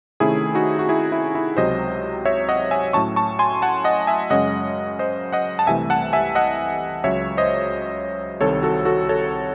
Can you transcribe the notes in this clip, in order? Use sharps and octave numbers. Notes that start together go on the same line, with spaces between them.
C3 D#3 A3 C#4 E4 G#4
D#4 F#4
F#4
E4 G#4
E4
E4
C#2 C3 F#3 C5 D#5
C#5 E5
D#5 F#5
E5 G#5
A2 F#3 C#4 A5 C#6
A5 C#6
G#5 C6
F#5 A5
D#5 F#5
E5 G#5
F#2 C#3 G#3 C#4 D#5 F#5
C5 D#5
D#5 F#5
A5
C2 C3 E3 A3 E5 G#5
F#5 A5
E5 G#5
D#5 F#5
C#2 C#3 F#3 C#5 E5
C5 D#5
C2 C3 D#3 A4 C#5
F#4 A4
F#4 A4
A4 C#5